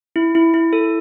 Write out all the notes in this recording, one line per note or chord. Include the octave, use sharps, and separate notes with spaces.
E4
E4
E4
A4